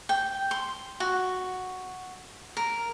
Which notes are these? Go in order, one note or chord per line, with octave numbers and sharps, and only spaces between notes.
G5
C6
F#4
A#4